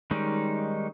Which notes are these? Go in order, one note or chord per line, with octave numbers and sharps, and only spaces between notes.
D#3 G3 G#3 C#4 D#4